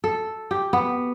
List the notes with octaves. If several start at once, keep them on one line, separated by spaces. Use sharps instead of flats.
A4
G4
B3